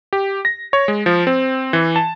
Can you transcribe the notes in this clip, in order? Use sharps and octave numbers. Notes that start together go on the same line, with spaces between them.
G4
A#6
C#5
G#3
F3
C4
E3
A5